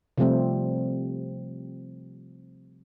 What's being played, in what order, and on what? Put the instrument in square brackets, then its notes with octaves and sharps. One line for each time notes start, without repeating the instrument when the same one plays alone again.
[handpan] C3 F3 G3 A3 C4 G4